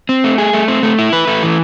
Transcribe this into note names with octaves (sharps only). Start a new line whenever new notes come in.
C4
A3
G#4
A3
C4
A3
E4
B4
A3
E3